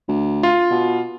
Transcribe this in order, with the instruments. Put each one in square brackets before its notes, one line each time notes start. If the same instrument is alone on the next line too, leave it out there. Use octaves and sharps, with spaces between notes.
[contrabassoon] D2
[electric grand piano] F4
[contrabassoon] B2